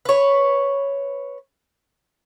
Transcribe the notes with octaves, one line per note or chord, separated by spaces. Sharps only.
B4 C#5